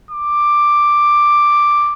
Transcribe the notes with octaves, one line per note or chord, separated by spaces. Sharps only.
D6